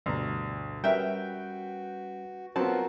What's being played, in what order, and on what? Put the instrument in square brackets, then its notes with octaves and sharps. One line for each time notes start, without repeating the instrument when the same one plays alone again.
[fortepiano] D2 [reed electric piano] G2 B2 A#5
[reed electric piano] G3 C#4 [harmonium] F#4 [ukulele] A#4 E5 [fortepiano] B4 G5
[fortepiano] F#3 B3 C4 [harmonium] F4 F#4 A#4 [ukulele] A5